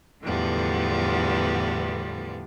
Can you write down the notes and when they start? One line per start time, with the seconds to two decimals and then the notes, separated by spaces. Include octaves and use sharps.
0.22 E2 A2 D3 F3 G3 B3